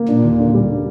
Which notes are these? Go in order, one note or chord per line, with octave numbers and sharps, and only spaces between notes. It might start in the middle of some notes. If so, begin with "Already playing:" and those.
Already playing: A#3
A#2 D4
D#2
D3
G3
D4